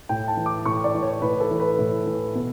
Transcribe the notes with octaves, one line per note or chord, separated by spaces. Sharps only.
A2 G5
A5
E3
D6
A2 C#6
D5
E3
C#5
A2 B4
A4
E3
B4
A2
E3
B2